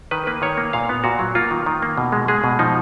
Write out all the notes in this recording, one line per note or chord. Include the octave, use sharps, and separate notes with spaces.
D#3 B4
A#3 B4
D#3 C#5
A#3
A#2 F5
B3
A#2 F#4
F#3
A#3 F4
D#3
D#3
A#3
B2
G#3
G#3 G#4
B2
F3 D#4